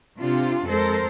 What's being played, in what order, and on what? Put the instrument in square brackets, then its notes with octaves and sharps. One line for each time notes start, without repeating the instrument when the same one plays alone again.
[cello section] C3 D4 F4
F2 G#3 A4 A#4 C5